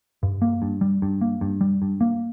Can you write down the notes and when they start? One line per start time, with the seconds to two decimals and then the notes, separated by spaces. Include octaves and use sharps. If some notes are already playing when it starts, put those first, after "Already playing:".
0.23 G2
0.42 A#3
0.62 G2
0.81 G3
1.02 G2
1.21 A#3
1.41 G2
1.61 G3
1.82 G2
2.01 A#3